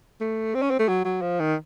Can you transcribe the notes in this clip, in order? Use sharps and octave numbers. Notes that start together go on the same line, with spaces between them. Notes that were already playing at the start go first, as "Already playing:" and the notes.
A3
C4
C#4
C4
A3
F#3
F#3
F3
D#3